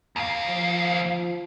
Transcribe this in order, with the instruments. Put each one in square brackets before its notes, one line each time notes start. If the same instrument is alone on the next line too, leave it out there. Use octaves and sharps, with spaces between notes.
[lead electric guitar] D#2 F5
[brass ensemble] F3